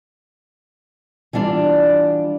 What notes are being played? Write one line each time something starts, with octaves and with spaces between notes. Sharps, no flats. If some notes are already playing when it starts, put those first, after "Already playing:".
E3 G3 D4 F4 D5